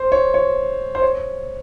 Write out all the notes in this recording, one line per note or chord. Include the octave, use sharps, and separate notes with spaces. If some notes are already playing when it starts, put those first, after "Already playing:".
Already playing: C5
C#5
C#5
C5
C#5